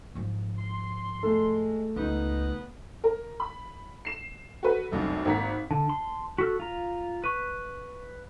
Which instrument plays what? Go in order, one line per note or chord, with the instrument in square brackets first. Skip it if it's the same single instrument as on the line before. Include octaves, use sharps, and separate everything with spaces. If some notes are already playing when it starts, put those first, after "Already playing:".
[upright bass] G#2 F3
[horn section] C6
[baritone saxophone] G#3 [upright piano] A3 A4
[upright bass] C#2 [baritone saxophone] B3 [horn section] D#4
[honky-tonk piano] A#4
B5
C7 E7
F#4 A4 B4
F1 C2 F#2
G#1 A#3 F#5 A#5 B6
[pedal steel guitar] D3 [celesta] A5
[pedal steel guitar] C6
[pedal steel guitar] F#4 A4 [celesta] F6 B6
[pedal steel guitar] F4 A#5
[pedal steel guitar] B4 [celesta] C#6 D#7